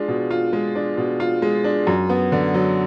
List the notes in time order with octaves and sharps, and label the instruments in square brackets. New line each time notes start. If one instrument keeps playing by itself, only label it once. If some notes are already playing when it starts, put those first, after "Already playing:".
Already playing: [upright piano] G#3 D4 F4
B2
F4
G#3
D4
B2
F4
G#3
D4
F#2
B3
D3
F#3